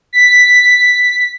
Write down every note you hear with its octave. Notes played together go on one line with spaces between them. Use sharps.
B6